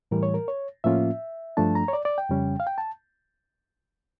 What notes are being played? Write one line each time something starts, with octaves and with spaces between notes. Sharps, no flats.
A2 E3 G3 A#4
C#5
A#4
C#5
A2 F3 A#3 C#4 F4 E5
G2 F3 A3 D4 A5
A#5
C#5
D5
D5
G5
F2 C#3 G3 C#4
F5
G5
A5